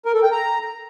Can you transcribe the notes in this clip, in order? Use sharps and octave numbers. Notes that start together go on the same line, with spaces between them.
A#4
A4
G5
A#5